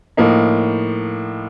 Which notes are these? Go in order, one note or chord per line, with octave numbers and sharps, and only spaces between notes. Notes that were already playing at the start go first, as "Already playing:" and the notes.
A2 F3 A#3 D#4